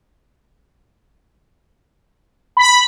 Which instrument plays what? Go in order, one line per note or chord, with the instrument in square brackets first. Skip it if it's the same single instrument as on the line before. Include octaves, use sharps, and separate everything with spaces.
[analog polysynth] B5